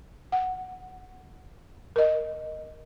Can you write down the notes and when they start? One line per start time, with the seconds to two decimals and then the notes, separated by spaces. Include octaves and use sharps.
0.32 F#5
1.96 A#4 D#5